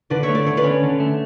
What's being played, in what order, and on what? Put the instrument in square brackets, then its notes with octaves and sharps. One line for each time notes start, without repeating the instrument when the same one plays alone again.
[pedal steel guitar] D3 [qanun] B4 D5
[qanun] C#5 E5
[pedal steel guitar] A3
[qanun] D5
[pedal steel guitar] D3 [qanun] C#5
[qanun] B4 D5
[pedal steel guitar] C#4
D3
A3